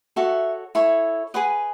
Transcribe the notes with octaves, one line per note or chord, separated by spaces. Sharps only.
F#4 A4 C#5 E5
E4 A4 C#5
G#4 B4 D#5 F#5